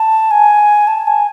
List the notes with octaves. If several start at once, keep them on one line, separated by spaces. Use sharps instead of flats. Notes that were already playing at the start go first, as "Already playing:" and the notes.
Already playing: A5
G#5
A5
G#5